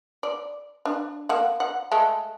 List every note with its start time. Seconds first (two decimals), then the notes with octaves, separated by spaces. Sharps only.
0.23 D5
0.85 D4
1.29 A#3 F#5
1.60 F#5
1.91 G#3 A3 A4